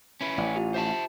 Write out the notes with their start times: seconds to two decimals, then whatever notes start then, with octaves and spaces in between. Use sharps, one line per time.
0.21 C#4 E4 B4
0.38 A1 D5
0.56 F4 G4
0.74 C5 E5 A5